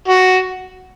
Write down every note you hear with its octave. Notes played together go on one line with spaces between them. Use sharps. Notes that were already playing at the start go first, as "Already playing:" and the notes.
F#4